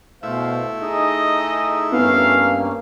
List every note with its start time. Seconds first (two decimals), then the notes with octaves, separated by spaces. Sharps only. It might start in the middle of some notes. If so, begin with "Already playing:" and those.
0.23 B2 A3 E4 C5 E5 F5
0.81 D#4 G#4 D#5
1.92 G2 A#3 B3 C#4 F5